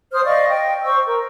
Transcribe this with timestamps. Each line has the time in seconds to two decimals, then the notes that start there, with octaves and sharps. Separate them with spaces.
0.12 C5 D#6 F6
0.25 D5 D#5 F5 C#6
0.48 D#5 G5
0.84 C5 C#6 E6
1.06 A#4